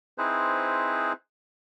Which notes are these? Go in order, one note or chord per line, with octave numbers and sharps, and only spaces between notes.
C4 D#4 E4 G#4 B4 C5